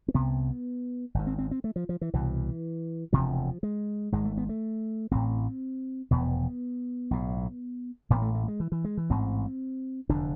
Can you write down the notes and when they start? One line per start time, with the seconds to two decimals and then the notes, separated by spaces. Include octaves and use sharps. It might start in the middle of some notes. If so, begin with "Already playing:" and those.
0.08 C4
0.14 C2 C3 B3
1.14 G#1 G#2
1.27 C4
1.38 C4
1.51 C4
1.64 A3
1.76 F3
1.89 F3
2.01 E3
2.14 C2 B2 E3
3.13 E1 D2 C3 F3
3.63 G#3
4.12 G#1 G#2 G#3
4.25 A3
4.37 B3
4.49 A3
5.11 A1 A2 C4
6.11 F1 E2 B2 B3
7.11 B1 A2
8.10 A1 A2 B3
8.22 A3
8.35 A3
8.48 G#3
8.60 E3
8.72 E3
8.84 G#3
8.97 E3
9.10 A1 G#2 C4
10.09 F1 E2 D3 D4